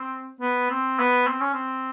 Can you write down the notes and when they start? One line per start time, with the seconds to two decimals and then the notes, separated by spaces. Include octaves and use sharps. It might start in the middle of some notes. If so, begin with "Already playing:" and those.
Already playing: C4
0.40 B3
0.70 C4
0.99 B3
1.27 C4
1.40 C#4
1.54 C4